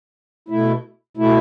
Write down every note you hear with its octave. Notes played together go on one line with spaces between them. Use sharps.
B2 A3 E4
B2 A3 E4